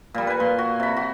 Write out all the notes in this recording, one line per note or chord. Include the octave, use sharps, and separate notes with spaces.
A#2 G3
B4 G#5
A#2 C6
F#4
C3 B5
F#4